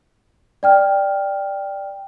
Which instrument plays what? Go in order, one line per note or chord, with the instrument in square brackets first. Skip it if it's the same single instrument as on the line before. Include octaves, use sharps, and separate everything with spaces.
[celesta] D5 G5 F6